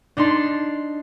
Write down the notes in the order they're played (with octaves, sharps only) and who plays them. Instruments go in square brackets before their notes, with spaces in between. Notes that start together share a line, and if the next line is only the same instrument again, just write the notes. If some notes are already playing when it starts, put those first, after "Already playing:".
[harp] D4 D#4 A5 C6